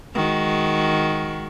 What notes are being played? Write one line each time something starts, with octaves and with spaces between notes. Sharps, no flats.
D#3 G#3 F#4